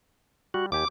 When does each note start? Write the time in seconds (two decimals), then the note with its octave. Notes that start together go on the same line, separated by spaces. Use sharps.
0.54 G3 F#4
0.72 D#2 G4 G#5 D6